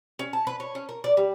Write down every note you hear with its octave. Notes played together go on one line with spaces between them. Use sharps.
C#4
A5
B4
C#5
C#4
A#4
D5
G3